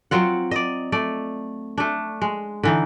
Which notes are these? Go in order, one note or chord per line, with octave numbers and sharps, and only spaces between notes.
F#3 C4 F4 F#5
D5 D#5
A3 D5
A3 D4
G#3
D3 E3 D#4